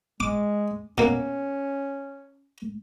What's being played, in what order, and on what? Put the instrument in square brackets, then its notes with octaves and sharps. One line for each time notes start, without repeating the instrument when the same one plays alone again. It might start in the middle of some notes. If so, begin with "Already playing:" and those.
[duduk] G#3 [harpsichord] D6
[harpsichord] B2 A#3 [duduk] C#4